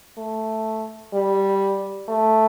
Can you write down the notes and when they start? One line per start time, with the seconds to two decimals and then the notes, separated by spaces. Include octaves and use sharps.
0.17 A3
1.13 G3
2.09 A3